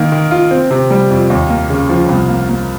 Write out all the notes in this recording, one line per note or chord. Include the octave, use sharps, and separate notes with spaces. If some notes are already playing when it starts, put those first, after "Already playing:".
Already playing: D#3 A#3
D#3
F4
C4
C3
G3
F2
D#2
A#3
C#3
F3
C2
A#3
A#3